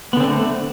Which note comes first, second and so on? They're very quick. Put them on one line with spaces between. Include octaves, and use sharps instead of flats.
B3 D3 C4 D4 A3